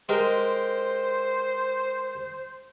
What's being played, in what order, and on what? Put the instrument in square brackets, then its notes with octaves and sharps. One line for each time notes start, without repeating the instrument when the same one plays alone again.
[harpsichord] G#3 G4 A#4 [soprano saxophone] C5